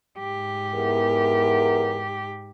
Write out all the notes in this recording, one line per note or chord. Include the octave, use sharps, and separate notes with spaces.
G#2 G4
E2 A#4